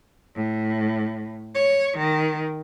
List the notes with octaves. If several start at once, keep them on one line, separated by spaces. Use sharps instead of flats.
A2
C#5
D#3